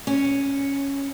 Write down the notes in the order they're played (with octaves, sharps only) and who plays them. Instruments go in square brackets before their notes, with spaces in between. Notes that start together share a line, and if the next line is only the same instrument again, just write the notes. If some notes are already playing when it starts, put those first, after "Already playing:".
[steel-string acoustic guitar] C#4